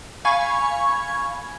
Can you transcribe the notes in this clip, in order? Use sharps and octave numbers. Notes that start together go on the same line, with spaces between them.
F5 G#5 B5 C#6 G#6